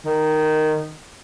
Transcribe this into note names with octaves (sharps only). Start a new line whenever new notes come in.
D#3